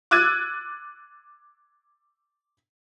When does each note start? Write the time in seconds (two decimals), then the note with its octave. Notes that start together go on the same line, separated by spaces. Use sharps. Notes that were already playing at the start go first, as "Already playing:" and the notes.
0.11 D6 E6 F#6 G#6 A6 D#7